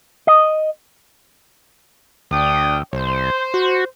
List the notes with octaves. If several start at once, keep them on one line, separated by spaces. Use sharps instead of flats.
D#5
D2 D4 G5 D#6
C2 C5
F#4